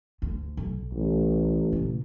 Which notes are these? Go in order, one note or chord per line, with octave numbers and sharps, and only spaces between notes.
D2
B1
A1
A#2 C#3